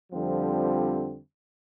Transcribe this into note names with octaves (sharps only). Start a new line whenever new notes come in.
F2 D3 F3 G3 C4